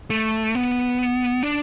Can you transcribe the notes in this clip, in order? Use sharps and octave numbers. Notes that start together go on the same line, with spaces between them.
A3
B3
D4